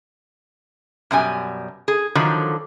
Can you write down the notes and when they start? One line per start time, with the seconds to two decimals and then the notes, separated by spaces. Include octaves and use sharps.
1.11 F#2 B2 G3 G#5
1.88 G#4
2.15 D3 D#3 F3 F#3